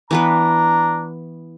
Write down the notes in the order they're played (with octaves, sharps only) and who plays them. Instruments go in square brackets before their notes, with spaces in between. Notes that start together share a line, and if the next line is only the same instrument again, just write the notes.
[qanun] E3 B3 B4 [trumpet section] D4 A#5